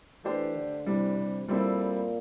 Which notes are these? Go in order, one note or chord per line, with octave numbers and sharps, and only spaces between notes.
E3 A3 D4 G4 C5
D3
C3 E3 G3 D4
C3
A#2 G3 C4 E4 A4 C5